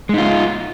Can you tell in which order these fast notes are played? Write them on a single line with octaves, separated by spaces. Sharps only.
G#3 D#4 F4